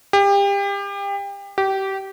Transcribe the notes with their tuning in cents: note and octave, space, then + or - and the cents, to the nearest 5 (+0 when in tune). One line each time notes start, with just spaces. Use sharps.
G4 +30
G4 -20